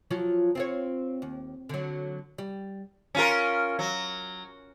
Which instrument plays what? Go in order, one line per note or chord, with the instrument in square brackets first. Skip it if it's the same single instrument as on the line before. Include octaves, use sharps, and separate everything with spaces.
[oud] F3 F#3 F4
C4 F4 C#5
D#2
D3 F#3
G3
[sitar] C#4 F4 A#4
F#3